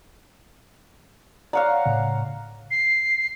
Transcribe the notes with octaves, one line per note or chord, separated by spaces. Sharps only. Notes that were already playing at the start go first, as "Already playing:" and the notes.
C#5 D5 F5 F#5 A#5
A2 C#3
C7